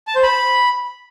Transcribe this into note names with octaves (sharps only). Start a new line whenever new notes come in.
A5
C5
B5